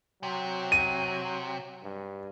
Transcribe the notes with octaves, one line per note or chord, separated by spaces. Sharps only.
C3 F#3
D#7
G2